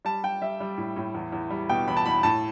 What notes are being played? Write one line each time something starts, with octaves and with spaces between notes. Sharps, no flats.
G3 A5
G3 G5
G3 E5
G3
A2
A2
E2
E2
G3
B2 G5
E2 B5
A5
E2 B5
A2 A5